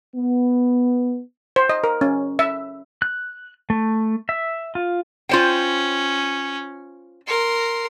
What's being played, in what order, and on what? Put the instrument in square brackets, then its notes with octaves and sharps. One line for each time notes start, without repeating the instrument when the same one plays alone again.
[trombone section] B3
[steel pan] C5
D#5
A#4
C#4
E5
[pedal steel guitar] F#6
A3
E5
F4
[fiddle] C#4 [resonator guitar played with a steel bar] F4 C5 G5
[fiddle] A#4 C6